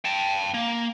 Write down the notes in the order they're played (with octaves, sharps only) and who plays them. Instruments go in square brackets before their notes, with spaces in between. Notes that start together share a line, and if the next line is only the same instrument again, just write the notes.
[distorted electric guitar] G5 A5
A#3